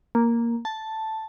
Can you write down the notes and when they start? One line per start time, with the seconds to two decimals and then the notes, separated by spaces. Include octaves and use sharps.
0.15 A#3
0.65 A5